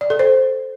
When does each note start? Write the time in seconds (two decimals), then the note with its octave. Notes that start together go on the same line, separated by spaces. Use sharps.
0.01 D5
0.10 A4
0.19 C5